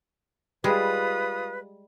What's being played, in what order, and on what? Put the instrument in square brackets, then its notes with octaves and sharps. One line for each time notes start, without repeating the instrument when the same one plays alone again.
[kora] G3 [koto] G#3 [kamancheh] F4 D#6 [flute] B4